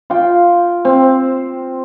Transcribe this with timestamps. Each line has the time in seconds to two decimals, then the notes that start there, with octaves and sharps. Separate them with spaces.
0.10 F4 G5
0.85 C4